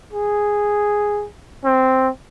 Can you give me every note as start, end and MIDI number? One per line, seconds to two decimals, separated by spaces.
0.13 1.27 68
1.65 2.09 60